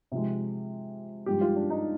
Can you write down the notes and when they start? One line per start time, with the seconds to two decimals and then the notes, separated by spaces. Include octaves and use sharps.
0.12 C3 F3 G#3
1.26 G2 F3 G#3 G4
1.41 F4
1.56 D4
1.70 D#4